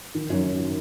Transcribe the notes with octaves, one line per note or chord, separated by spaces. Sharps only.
D#3
F#2
D#3
D#3